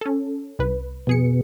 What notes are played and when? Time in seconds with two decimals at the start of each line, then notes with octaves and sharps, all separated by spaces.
0.01 C#4 A4
0.59 C2 B4
1.07 F2 B2 G#4 C#7